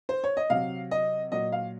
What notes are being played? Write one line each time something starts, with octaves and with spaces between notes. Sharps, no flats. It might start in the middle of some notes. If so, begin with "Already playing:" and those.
C5
C#5
D#5
C3 F#3 F5
D#5
A#2 F#3 D#5
F5